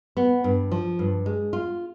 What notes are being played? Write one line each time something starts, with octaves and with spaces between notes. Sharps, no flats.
B3
G2
F3
G2
G#3
F4